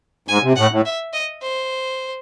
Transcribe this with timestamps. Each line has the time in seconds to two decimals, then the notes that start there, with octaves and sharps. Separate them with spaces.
0.28 G#2 G#5
0.43 C3
0.56 A2 F#5
0.71 A2
0.85 E5
1.14 D#5
1.42 C5